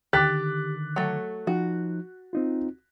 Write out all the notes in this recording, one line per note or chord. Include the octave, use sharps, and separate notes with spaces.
D3 D#3 G4 D6 F#6 A6 B6
F#3 A3
F3 D#4 F#4
C4 D#4 F4